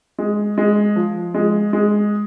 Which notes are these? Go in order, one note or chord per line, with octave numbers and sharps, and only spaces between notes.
G#3
G#3
F3
G#3
G#3